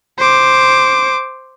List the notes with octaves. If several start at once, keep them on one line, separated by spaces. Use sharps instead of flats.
C5 D6